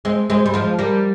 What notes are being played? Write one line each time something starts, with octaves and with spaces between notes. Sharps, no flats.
G#3 C4
G#3 C4
G3
F3 G#3
G3 A#3